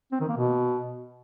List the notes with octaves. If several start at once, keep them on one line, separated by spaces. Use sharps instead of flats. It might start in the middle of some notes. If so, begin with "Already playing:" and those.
C4
D#3
A#3
B2